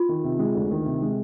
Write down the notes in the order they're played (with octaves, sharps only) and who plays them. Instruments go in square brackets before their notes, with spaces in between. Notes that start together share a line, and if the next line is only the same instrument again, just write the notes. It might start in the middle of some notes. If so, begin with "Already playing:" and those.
Already playing: [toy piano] F4
[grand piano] D#3
C3
G#3
D2
D#3
C3
G#3